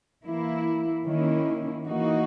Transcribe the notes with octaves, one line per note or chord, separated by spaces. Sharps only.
E3 A#3 E4
D#3 A#3 C#4 E4
E3 A#3 D#4 F#4